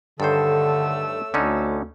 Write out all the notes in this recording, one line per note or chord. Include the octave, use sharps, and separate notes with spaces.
G2 D3 D#3 A3 A4 C5 C#5 E6
D2 D3 C#4 D#4